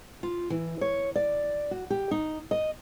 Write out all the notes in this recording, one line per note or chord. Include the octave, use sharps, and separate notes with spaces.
F4
E3
C#5
D5
F#4
G4
D#4
D#5